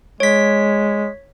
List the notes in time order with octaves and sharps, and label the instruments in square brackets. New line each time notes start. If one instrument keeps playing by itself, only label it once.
[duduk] G#3 [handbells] C#5 B6